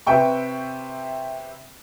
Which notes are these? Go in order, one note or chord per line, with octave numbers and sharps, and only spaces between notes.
C3 B4 E5 G5 C#6